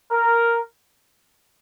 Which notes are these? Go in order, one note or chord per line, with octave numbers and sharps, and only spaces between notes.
A#4